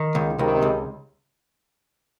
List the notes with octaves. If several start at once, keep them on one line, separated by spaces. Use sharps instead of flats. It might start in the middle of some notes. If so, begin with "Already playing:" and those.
Already playing: D#3
C#2
C#2 C3 D#3
C#2